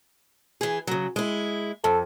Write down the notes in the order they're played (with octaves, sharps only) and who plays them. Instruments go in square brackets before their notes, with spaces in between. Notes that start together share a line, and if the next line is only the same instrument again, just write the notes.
[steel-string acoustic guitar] E3 G#4
C#3 F#3
G#3 E4
[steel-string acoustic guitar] F2 [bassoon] A4